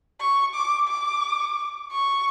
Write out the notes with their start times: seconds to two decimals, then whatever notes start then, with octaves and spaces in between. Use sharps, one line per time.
0.21 C#6
0.55 D6
0.88 D6
1.92 C#6